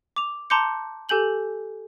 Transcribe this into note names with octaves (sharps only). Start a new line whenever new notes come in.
D6 F7
A5 A#5 C6 D6 G6 C#7
G4 A4 G#5 G6 F#7 G7